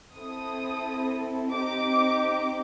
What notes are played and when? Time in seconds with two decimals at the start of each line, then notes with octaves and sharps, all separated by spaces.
0.15 C4 E4 A4 D#6
1.52 C4 D#4 G4 D6